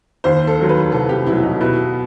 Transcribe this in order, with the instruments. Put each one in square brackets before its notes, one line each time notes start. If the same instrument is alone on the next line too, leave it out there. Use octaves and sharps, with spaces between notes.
[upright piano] D#2 [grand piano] C5
[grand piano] A4
[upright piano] D#3 F#3
[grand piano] B4
[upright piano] C2 [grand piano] A4
[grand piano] G4
[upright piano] B2 F#3 [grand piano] E4
[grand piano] D#4
[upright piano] B2 [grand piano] E4